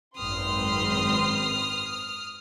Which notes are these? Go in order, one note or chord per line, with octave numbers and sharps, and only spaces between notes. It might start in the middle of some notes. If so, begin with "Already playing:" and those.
G#1 F#2 C4 B4 C6 D#6 F6